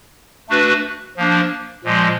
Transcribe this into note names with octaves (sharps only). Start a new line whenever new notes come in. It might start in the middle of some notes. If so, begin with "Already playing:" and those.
A3 D4 F#4 B4
F3 A#3 D4
A#2 F3 G#3